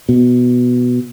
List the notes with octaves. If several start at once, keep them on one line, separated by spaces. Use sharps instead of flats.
B2